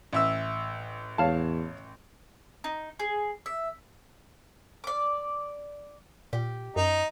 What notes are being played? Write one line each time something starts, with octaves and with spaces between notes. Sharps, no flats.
A1 E5 E6
E2 C#5 F5 A5
D#4
G#4
E5
D5 D6
A#2 G4
F#2 D#4